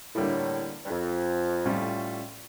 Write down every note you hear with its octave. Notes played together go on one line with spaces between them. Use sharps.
A2 D3 G3 A#3
G2
F2
A2 G3 C#4 F4